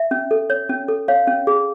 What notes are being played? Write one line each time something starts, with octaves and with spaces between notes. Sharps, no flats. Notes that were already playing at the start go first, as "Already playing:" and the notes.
Already playing: E5
C#4
A4
C#5
C#4
A4
C#5 F5
C#4
G#4